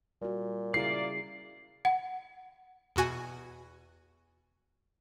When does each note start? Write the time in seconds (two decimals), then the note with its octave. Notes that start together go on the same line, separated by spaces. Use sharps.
0.22 A#2 G3 F#4
0.74 C#3 A#3 E4 G#4 D5 C7
1.85 F#5
2.96 E2 B2 F#4 G#5